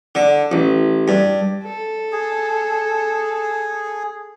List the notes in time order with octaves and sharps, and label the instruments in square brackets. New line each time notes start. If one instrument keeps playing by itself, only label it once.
[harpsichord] D3
A1
G2
[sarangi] A4
[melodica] G#4